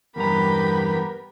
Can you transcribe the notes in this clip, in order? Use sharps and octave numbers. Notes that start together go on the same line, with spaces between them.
E2 G2 B3 G4 A#4 A#5 B5